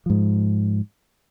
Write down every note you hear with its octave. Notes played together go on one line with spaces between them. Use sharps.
G#2 F3